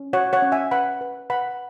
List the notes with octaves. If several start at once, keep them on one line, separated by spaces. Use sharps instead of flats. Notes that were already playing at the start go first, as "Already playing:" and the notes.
Already playing: C#4
F#4 C#5 F#5
C#5 F#5
C#4
E5 G#5
B4 F#5 B5
B4
B4 F#5 B5